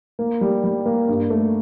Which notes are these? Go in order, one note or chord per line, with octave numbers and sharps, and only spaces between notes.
A#3
G3
G3
A#3
G2
A3